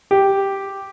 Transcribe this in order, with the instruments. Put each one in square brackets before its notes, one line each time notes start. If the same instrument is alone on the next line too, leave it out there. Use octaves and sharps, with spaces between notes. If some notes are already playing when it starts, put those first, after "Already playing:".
[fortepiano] G4